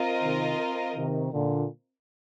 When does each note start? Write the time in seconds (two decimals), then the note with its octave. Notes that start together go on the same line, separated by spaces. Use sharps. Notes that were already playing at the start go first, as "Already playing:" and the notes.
Already playing: C4 F4 A#4 D#5
0.22 C3 D#3
0.95 C3 D#3
1.32 A#2 D3